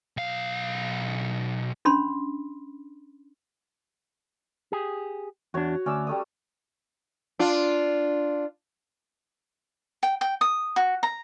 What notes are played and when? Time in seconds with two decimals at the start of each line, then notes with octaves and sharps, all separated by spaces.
0.17 B1 F5
1.85 C#4 D4 B5 C6
4.72 G4 G#4
5.54 E2 D4 F#4 C#5
5.86 D2 C#4 D5 E6
6.07 G3 A3 D#6
7.39 D4 F4
10.03 G5
10.21 G5
10.41 D#6
10.76 F#4
11.03 A#5